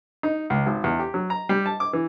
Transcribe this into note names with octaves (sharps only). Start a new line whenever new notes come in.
D#4
C#2
G#1
E2
G4
F#3
A#5
G3
A5
D6
E3